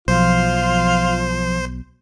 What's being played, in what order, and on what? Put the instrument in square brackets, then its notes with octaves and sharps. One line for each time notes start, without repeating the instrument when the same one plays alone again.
[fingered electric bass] B1 [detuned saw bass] F3 [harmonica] F4 [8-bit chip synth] C5